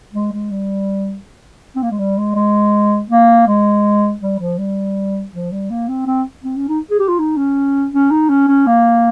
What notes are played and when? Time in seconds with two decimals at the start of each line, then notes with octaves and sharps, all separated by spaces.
0.14 G#3
0.32 G#3
0.51 G3
1.76 C4
1.83 A#3
1.91 G#3
1.99 G3
2.18 G#3
2.35 G#3
3.10 A#3
3.48 G#3
4.21 G3
4.39 F3
4.58 G3
5.33 F3
5.52 G3
5.70 A#3
5.89 C4
6.06 C4
6.44 C4
6.57 C#4
6.68 D#4
6.91 G#4
6.99 G4
7.08 F4
7.19 D#4
7.37 C#4
7.92 C#4
8.11 D#4
8.29 C#4
8.48 C#4
8.67 A#3